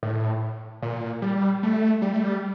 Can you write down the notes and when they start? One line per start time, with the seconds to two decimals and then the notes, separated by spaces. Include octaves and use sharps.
0.03 A2
0.82 A#2
1.22 G3
1.63 A3
2.02 G3
2.13 A3
2.23 G3